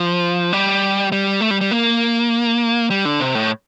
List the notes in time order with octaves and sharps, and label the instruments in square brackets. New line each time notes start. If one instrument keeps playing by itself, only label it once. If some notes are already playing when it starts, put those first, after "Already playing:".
Already playing: [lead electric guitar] F3
G3
G3
A3
G3
G3
A#3
G3
D3
C3
A2